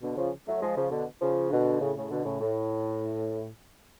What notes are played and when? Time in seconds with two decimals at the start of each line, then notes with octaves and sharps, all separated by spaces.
0.02 B2 D3
0.17 C#3 F3
0.47 F#3 A3
0.62 F3 G#3
0.77 C#3 F3
0.91 B2 D3
1.21 C#3 F3
1.51 B2 D3
1.81 A2 C#3
1.96 A2 C#3
2.10 B2 D3
2.26 A2 C#3
2.41 A2